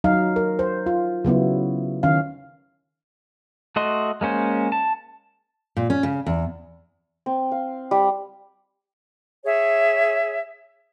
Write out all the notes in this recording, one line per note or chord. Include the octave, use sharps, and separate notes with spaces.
F#3 D#4 F5
A#4
C5
F4
C#3 F#3 B3 E4
D#3 C#4 F5
A3 F#4 D#5 C6
G#3 A#3 C#4 C5
A5
A#2
C#4
C#3
E2
C4
F5
G3
G#4 C#5 E5